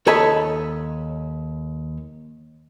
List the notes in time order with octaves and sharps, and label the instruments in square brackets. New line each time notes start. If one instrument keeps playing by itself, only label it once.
[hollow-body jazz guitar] D#2 A4 C#5 D#5 A5 B5